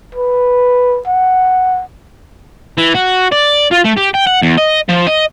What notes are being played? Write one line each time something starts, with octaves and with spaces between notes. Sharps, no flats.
B4
F#5
E3
F#4
D5
F4
A3
G4
G5
F#5
E2
D#5
F3
D#5